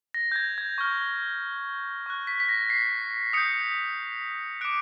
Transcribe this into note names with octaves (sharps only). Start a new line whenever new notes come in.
A#6
G6
G#6
G#6
C#6 F6 G#6
C#6 F#6
B6
B6
A#6
C7
D#6 G6 C#7
D6 F#6 D7